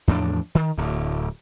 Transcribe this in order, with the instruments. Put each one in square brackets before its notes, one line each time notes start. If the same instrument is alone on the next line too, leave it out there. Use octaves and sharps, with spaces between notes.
[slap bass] E2 A2 F3 D4
D#3
D1 D2